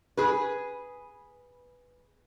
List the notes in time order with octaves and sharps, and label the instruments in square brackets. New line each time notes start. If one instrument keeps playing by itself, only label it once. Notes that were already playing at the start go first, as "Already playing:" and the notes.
[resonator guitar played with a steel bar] G#4 B4